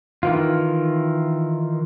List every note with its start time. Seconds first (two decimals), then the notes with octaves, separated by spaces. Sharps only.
0.23 D#3 E3 F4